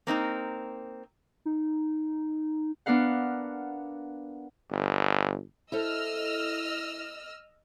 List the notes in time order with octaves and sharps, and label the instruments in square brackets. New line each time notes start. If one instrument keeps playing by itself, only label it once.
[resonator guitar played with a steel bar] A#3 C4 D#4 A#4
[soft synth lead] D#4
[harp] B3 D4 A#4 F5 F#5
[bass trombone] G1
[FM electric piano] E4 [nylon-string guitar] A4 C5 E5 [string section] D#5 E6 F6